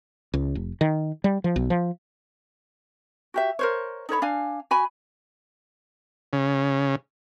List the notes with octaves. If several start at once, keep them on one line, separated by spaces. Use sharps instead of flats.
C#2
F1
D#3
G3
F3
B1
F3
F#4 G4 E5
A#4 C5 C#5
D#4 A4 C#5 B5
D4 F5 G#5
F#4 G#5 B5
C#3